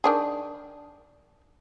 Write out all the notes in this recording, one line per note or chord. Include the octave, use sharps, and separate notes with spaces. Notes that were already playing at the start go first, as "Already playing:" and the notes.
D#3 D4 G#4